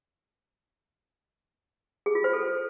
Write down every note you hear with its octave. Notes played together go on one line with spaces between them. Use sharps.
G#4
F4
C5
A4